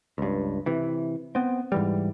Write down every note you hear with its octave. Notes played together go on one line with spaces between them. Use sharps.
C#2 G2
C3 E3
B3 C4
G#2 E3 G3